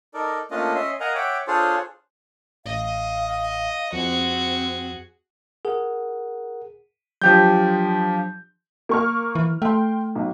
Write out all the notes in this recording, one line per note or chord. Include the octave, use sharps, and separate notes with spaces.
D#4 A4 A#4 D5
A3 A#3 C#4 D4 F4 D#5
C#4 D#5 E5 C6
A#4 D#5 F5 F#5 G#5 A#5
C#5 E5 F#5 G5 D6
D4 F4 G#4 A4 C5 C#5
A1 D#5 F5
F2 C4 F#4 G#4
G#4 A#4 F#5
F3 F#3 D4 G4 G6
A#3 C#6 F6
E3
A3 G5 C6
B1